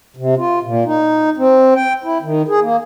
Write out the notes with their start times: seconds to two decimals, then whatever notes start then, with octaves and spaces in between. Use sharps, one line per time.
0.17 C3
0.37 F4
0.63 A#2
0.86 D#4
1.37 C4
1.75 G5
2.04 E4
2.22 D#3
2.48 G#4
2.61 A#3